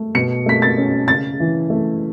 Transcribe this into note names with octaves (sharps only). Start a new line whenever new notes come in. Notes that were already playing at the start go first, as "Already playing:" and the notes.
Already playing: A3
B2 C#7
A3 B6
A6
C#4
C#3 A6
E3
A3